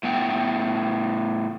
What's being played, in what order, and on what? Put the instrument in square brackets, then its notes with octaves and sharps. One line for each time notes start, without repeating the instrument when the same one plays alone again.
[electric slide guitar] A2 B3 G5